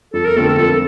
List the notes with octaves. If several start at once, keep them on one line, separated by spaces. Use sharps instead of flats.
F2 A4
A#4
D3 A3 C4 F4 A4
A4
F2 A4